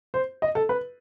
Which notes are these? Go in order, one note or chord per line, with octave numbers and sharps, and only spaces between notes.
C5
D#5
A4
B4